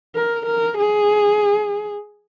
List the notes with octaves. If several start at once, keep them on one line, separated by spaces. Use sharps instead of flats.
A#4
A#4
G#4